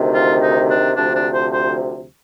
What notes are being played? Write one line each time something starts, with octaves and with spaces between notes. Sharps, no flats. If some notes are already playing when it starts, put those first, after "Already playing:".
Already playing: D2 C3 D#3
F4
D#4
D4
D2 C3 F3 D4
D4
C5
C5